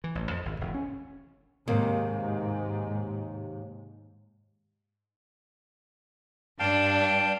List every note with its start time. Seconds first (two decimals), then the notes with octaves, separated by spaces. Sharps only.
0.04 E3
0.15 A1
0.31 F2
0.45 G#1
0.61 E1
0.74 C#4
1.68 D#2 G#2 C3 A#3
6.59 G2 D4 F5 G5 A5